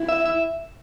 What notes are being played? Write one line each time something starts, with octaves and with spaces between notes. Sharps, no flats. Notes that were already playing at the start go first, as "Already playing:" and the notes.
Already playing: E4
E5
E5